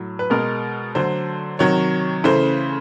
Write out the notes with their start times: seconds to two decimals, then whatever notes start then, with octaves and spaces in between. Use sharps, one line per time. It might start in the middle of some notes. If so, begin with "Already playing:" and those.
Already playing: A2 F#3
0.19 B4
0.30 B2 G#3 A#4
0.95 D3 F#3 A3 C5
1.59 C3 D#3 F#3 C#5
2.24 C#3 E3 A3 C5